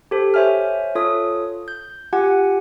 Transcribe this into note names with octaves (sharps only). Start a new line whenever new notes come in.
G4 A4 C5
C5 C#5 E5 G#5 F6
F4 A4 C#5 D#6
G6
F4 G4 F#5 G#5